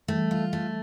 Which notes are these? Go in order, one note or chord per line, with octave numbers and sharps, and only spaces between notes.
E3 G3 A3
F4
A3